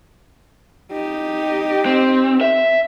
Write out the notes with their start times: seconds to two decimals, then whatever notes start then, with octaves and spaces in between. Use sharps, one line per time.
0.92 D#4 G4
1.86 C4
2.41 E5